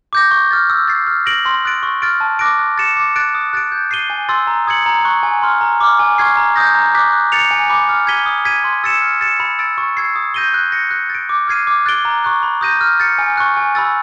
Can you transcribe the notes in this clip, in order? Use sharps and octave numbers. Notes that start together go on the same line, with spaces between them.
D6 G6 A#6
C#6
F6 A6
E6
A6 C7
F6
A#6 D7 F#7
C6
D#6 F#6 A6 D7
C#6
F6 A6 D7
A5
D6 F#6 A#6 D7
F#6
A6 C#7 E7
D6
F#6 A6 D7
D#6
F#6 A6 D7
G6
C7 D#7 G7
G#5
C6 E6 A6
A#5
D#6 G#6 C#7 F#7
A#5
C#6 F#6
G#5
C6 F6
A#5
D6 F6
G#5
C#6 F6 G#6 C7
A#5
D#6 G6 A#6
A#5
D6 F#6 B6
F#6
A6 C#7 F7
G#5
B5 D6
F6
G#6 B6 D#7 G7
D#6
G#6 B6 D#7
C6
E6 A6 C#7 E7
F6
A6 C#7 E7
B5
E6 A6 D7
C#6
E6 G#6 C7
D#6
G6 A#6 D#7 G7
F#6
A#6 C#7
F#6
A6 D7
D6
F6 G#6 C7 D#7
D6
F#6 A6 D7 G7
A#5
C#6 F#6
B5
D#6 G6 A#6 D#7
F6
A6 C#7
G#5
C#6 F#6
G#5
B5 E6 A6